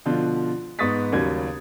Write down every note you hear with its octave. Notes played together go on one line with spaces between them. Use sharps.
B2 D3 F3 F4
G#2 B3 C#6 D#6 A6 B6
D#2 C#3 F#3 G3 G#6